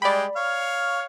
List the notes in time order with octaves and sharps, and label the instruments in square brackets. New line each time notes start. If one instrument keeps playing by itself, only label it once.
[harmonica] G3 G#3 G5 [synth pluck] D5 B5
[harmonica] C#5 F5